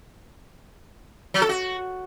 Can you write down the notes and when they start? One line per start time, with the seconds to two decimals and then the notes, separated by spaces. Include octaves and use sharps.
1.34 F#3
1.42 A4
1.49 F#4